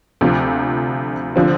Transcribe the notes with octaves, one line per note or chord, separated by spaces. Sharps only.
D2 C3 F3
D3 F3 C4